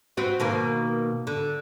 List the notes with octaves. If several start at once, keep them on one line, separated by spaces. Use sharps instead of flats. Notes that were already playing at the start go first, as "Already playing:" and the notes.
C4 F#4 B4
B2 D#3 A#3
D3